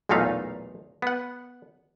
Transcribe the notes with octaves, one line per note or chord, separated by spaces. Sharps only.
B1 E2 A#2 A3 D#4 F5
B3 F#5